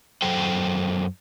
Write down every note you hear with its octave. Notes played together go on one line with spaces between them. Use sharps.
F#2 F#3 A4 C5 G5